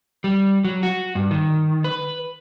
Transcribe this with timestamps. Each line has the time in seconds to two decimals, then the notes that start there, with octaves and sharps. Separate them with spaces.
0.24 G3
0.64 F#3
0.83 F#4
1.15 G2
1.31 D#3
1.84 B4